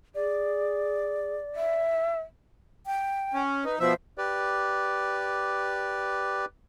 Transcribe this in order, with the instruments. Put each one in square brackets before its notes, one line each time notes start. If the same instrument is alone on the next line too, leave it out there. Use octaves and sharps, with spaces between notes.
[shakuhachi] G#4 [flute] D5
[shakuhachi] E5
[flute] G5
[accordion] C#4
[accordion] D#4 [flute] B4
[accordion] B2 F3 E5 [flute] C5
[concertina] G4 B4 D5